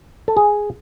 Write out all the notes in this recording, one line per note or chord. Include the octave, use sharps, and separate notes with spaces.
A4
G#4